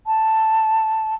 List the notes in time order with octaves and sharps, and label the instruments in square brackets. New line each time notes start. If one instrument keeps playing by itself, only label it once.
[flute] A5